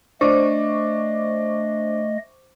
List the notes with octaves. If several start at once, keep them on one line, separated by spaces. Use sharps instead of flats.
A3 D4 C5 D#5 C#6 D6